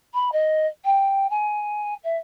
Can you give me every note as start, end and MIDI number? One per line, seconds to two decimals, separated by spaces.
0.14 0.31 83
0.32 0.67 75
0.84 1.29 79
1.30 1.94 80
2.03 2.16 76